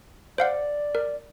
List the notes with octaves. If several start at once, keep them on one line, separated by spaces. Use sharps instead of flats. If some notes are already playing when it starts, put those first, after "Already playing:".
C5 D5 F5 F#5
A#4